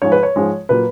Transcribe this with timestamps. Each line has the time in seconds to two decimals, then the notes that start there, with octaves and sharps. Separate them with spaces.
0.02 G#2 F3 G#3 C#5
0.12 B4
0.23 C#5
0.36 G#2 F3 G#3
0.69 A#2 F#3 B4